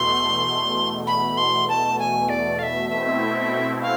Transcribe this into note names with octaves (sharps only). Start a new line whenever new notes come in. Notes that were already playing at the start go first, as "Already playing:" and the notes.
Already playing: E2 B2 A3 C6
B5
C6
A5
G#5
D5
F5
E5
B2 A3 C4 E4 E5
F5